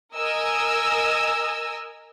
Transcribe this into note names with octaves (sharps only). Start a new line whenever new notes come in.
A#4 D#5 G#5 E6